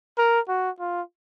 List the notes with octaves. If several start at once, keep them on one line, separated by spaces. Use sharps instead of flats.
A#4
F#4
F4